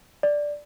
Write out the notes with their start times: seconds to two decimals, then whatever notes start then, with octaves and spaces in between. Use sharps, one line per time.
0.23 D5